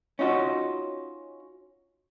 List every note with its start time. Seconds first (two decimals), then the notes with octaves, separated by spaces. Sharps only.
0.19 C#4 D#4 F4 F#4